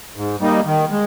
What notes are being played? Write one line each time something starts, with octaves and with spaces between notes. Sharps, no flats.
G#2
G3 A#3 D#4
D#3
G#3